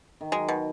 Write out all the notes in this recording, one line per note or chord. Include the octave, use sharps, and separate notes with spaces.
D#3
F#3 G#3
B2